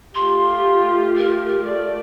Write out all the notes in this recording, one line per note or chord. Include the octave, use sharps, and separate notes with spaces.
A3 F4 G4 C6
A#4
A3 D5